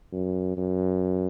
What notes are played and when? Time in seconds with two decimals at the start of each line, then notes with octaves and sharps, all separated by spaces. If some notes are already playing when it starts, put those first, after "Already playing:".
0.12 F#2
0.57 F#2